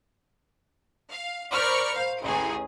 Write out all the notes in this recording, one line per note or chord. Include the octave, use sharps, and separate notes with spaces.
F5
A#4 C5 D5 B5 C#6 F6
C5 F5
A1 D#2 G#4